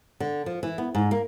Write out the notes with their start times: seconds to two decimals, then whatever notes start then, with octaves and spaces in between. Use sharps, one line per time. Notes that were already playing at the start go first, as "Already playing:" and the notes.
0.20 D3
0.46 F3
0.63 E3
0.78 B3
0.95 G#2
1.11 A#3